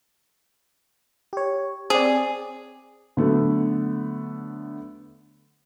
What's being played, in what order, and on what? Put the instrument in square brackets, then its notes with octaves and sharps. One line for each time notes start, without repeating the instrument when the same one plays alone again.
[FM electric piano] G4 C#5
[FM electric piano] C4 D5 [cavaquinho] G#4
[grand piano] D3 F#3 A3 B3